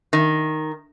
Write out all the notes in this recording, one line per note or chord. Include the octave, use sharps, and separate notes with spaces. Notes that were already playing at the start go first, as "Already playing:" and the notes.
D#3